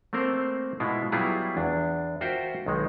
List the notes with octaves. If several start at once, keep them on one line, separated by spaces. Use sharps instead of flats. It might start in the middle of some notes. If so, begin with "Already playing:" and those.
A3 A#3 C4 A#4 C5
B2 G#3 B3 E4 F4
F#3 G3 B3 E4 F4 G#4
E2 D4
F4 F#4 A#4 C5 E5 G5
B1 D#3 G#3